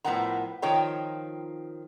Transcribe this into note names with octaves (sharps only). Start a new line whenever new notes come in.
A2 F3 B3 A#4 F#5 A#5
D#3 F3 F4 C#5 G5 A#5